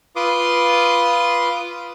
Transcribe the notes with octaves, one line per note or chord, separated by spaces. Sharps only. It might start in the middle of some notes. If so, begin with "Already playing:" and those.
F4 B4 C6 D6 D#6